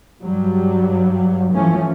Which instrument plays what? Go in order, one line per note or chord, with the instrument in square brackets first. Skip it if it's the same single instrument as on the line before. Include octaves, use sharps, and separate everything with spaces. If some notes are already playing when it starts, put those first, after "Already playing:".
[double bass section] G2 F#3 G3
E3 F3 A3 C#4